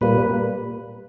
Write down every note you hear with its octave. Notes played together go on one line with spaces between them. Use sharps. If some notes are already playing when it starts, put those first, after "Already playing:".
A#2 G3 A#3 B4